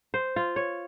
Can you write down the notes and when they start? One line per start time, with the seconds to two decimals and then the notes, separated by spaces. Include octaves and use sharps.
0.14 C5
0.36 F4
0.56 C#5